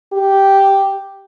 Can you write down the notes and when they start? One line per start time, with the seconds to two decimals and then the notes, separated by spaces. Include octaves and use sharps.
0.13 G4